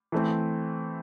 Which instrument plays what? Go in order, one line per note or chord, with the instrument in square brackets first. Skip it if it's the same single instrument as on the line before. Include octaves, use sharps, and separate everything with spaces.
[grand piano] E3 A3 C4